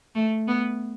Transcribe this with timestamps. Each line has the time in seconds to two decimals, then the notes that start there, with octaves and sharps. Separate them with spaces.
0.15 A3
0.47 B3